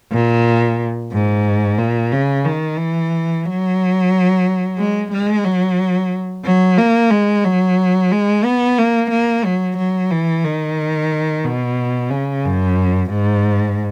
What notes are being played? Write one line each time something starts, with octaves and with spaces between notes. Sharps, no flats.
A#2
G#2
A#2
C#3
D#3
E3
F#3
G#3
G#3
F#3
F#3
A#3
G#3
F#3
G#3
B3
A#3
A#3
F#3
F#3
E3
D#3
B2
C#3
F#2
G#2